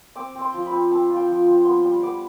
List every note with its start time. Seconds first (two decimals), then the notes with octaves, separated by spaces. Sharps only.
0.16 C4 D6
0.35 C4
0.41 C6
0.54 F3
0.66 B5
0.72 C4
0.91 C4 A5
1.10 F4
1.16 G5
1.28 F3
1.47 F3
1.65 B3 C6
1.84 G3
2.03 B3 D6